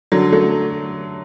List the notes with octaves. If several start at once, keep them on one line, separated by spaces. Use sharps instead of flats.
D3 F#3
F#3 A3